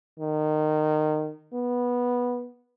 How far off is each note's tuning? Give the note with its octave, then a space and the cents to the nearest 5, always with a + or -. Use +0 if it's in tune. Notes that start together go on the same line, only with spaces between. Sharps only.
D#3 -20
B3 -10